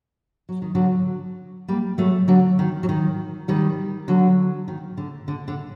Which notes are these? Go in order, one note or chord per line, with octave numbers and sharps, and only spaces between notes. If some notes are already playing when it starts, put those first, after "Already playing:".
F#3
D#3
D3 F#3
G3 A#3
F#3 A3
D3 F#3
D#3
F#3
D#3
D#3 G3
D3 F#3
D#3
D3
D3
D3